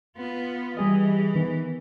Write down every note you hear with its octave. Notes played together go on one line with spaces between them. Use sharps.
B3 F4
E3 G3 G#4 D#5
D#3 B3